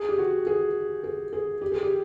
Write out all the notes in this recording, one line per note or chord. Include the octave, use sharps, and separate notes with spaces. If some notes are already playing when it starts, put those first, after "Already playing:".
Already playing: G#4
G4
F#4
G#4
G#4
G#4
G4
G#4
G4